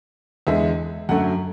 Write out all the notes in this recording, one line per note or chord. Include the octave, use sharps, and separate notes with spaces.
E2 D3 G#3 E5
F#2 D3 F#3 A3 F#5